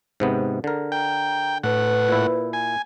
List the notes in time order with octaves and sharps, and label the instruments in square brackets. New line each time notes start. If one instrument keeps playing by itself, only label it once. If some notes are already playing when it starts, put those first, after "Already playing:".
[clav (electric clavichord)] G#2 C3 B3
[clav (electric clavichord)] D3 A#4 [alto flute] G#4
[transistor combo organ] G5 [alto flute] A#5
[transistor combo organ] A2 F#5 [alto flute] B4
[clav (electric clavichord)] A#2 E4
[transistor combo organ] G#5